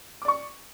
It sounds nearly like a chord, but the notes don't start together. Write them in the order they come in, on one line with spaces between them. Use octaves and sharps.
D6 D5 C#6